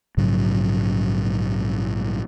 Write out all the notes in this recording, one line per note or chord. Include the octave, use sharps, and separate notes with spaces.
A#1 G#2 C#3 F#3